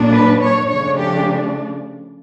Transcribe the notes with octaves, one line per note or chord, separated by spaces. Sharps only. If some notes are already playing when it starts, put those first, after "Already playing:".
Already playing: A#2 F#3 A#3 D4
B4
C#5
C#3 F3 A3 D4 C#5
G4